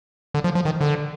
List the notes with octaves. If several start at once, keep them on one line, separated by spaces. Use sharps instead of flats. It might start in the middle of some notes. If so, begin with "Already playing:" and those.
D3
F3
F3
D#3
D3